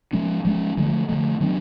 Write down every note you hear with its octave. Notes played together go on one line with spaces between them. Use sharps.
F3 G#3 C#4
F3 G#3 C#4
D3 F3 A3
D3 F3 A3
D#3 F#3 B3 D4